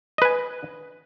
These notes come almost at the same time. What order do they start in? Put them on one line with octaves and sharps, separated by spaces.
D#5 B4 G#5